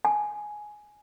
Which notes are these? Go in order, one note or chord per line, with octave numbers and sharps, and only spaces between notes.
G#5